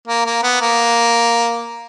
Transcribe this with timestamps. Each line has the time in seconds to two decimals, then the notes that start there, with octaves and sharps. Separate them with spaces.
0.08 A#3
0.26 A#3
0.43 B3
0.62 A#3